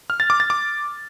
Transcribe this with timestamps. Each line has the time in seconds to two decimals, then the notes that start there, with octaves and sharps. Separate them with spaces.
0.10 F6
0.20 A6
0.30 D6
0.40 A6
0.50 D6